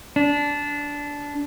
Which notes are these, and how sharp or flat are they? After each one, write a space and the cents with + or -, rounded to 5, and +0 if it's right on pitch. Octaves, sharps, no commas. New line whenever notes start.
D4 -15